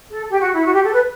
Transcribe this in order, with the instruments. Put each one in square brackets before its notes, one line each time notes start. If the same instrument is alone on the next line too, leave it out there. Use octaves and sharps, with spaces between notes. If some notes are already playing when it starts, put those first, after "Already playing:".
[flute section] A4
G4
F#4
E4
F#4
G4
A4
B4